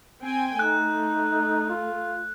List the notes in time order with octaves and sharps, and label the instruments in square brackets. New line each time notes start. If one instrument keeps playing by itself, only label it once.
[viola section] C4 G5 G#5
[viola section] A3 [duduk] D#4 [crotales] F#6
[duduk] F4